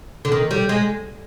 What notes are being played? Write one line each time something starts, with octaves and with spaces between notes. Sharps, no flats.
D3
D#3
G3
G#3